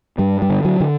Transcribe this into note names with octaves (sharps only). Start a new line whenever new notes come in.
G2 G3
G3
D3
F#3
D3